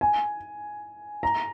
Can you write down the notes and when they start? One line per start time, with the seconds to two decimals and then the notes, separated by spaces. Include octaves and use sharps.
0.01 G#5
1.23 A#5